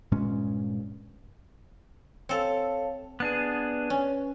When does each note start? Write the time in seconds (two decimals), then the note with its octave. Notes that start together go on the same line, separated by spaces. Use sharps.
0.12 G2 A#2 G#3 C#4
2.29 C4 A4 C#5 F5 A5
3.20 B3 D4 G#4 B4
3.90 C#4